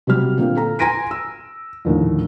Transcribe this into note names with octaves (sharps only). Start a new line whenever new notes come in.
C3 F#3 G3 F6
A#2 D3 A#3 C4
A4 A#5
G#5 A#5 C6 A#6 D7 D#7
E6
A#1 D#2 A2 D3